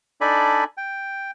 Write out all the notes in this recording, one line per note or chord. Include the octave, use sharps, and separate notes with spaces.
D4 D#4 A4 D5 G#5 B5
G5